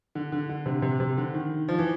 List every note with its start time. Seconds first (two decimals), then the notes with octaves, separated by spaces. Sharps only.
0.15 D3
0.32 D3
0.49 D3
0.66 C3
0.82 C3
1.00 C3
1.17 D3
1.34 D#3
1.68 F3
1.78 E3